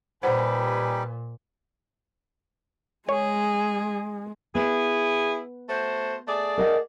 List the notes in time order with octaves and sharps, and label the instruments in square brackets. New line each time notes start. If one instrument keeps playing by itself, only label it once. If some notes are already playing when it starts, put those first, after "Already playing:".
[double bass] A#2 [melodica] G3 D#4 G4 [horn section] B4 G#5 [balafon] C5 F#5
[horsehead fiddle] G#3 [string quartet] G#4 [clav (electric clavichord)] C#5
[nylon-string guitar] B3 [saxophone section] E4 G#4
[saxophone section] A3 F#4 C5
A3 G#4 D5
[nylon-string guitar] A#4 D#5 F#5